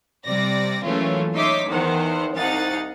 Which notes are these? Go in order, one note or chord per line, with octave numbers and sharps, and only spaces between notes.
C3 G3 D5 A#6
E3 F#3 A3 A#3 C#4 F4
D#4 C#5 E5 C6 D6 B6
E2 D#3 E3 C5 F#5
C2 D#4 F5 F#5 A6